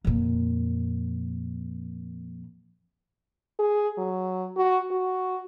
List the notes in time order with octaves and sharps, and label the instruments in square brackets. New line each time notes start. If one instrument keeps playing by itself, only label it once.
[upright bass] F2 A#2
[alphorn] G#4
F#3
F#4
F#4